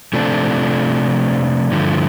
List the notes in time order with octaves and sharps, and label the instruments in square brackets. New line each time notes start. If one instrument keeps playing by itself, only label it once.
[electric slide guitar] C3 F3 A3 D4
G2 D3 F3 A3